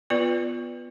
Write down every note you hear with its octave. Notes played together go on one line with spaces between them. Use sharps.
B3 F4 B4 D5